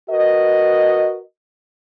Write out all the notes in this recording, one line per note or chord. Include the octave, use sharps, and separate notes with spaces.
F#4 A#4 B4 D#5